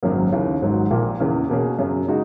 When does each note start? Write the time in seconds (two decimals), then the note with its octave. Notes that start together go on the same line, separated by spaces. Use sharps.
0.03 G#1 F#2 C#3 F#3 A#3
0.32 D#2 C#3 E3
0.62 G#1 G#2 F#3
0.91 A#1 A#2 A#3
1.20 E2 C#3 E3 A#3
1.49 B2 A#3 C#4 G#4
1.79 F#2 C#3 F#3
2.08 C#3 G#3 D#4 F#4